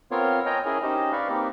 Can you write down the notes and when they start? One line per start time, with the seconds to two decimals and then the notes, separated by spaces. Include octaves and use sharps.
0.11 B3 C4 F4 A#4 C#5 F5
0.46 C#5 D#5 G5 G#5 A#5
0.66 C#4 E4 G#4 A#4 G#5
0.83 C#4 D#4 G4 C5 D#5
1.12 B4 D5 F5 B5 C#6
1.29 A#3 C4 D#4 G4